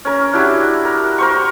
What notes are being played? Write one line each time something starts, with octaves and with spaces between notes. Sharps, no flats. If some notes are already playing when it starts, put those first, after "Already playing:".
C#4 A#4
D4 E4 F#4 G4
A#4
A#4 C5 C#6